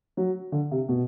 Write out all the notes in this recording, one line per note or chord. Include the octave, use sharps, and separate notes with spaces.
F#3
D3
C3
B2